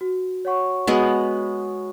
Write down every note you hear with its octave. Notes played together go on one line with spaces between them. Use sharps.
F#4
C#5 F#5 C#6
G#3 B3 F#4